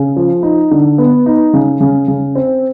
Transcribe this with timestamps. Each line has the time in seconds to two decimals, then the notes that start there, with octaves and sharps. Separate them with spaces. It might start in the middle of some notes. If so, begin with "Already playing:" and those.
Already playing: C#3
0.16 F3
0.43 D#4
0.71 D3
0.98 B3
1.26 D#4
1.53 C#3
1.80 C#3
2.08 C#3
2.35 C4